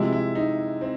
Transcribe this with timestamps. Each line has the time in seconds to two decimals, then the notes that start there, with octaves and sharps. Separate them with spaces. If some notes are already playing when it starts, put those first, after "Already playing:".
Already playing: C3 F3 G#3 E4
0.13 E4
0.35 D#4
0.81 C4